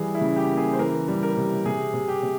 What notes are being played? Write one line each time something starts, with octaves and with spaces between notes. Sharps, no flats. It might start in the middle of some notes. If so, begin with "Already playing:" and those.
Already playing: E3 G3 G#4
E4
C#3
G4
A#3
G#4
C5
E3 A#4
G3
A#4
C3
C3 G#4
C3
G4
C3